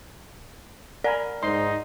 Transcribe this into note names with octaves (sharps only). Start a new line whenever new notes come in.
A#4 D5 G#5 B5
G#2 D#4 C6